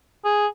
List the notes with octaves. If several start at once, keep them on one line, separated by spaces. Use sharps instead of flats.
G#4